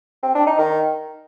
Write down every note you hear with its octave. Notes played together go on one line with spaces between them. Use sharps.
C4
D4
D#4
D#3